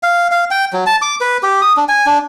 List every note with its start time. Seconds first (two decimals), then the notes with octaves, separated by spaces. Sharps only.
0.03 F5
0.31 F5
0.51 G5
0.73 F#3
0.86 A5
1.02 D6
1.21 B4
1.43 G4
1.62 D#6
1.77 D4
1.88 G#5
2.06 D4